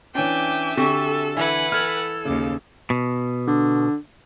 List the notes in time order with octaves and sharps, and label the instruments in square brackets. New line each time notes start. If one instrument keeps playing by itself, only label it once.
[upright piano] E3 C#4 D4 [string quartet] E5 G#5 [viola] G5 D6
[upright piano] D3 [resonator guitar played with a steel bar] C4 F#4 G4 [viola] A4
[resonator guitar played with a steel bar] E3 E4 [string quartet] B4 F#5 G#5
[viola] A4 [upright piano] F6 G#6
[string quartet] D#2 D6 [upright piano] C#3
[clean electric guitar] B2
[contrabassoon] D3